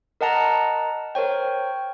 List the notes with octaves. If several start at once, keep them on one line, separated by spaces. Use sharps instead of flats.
A#4 D#5 F#5 A5 A#5
A#4 C5 C#5 G5